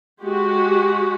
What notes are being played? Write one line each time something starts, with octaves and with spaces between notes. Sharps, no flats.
G#3 F#4 G4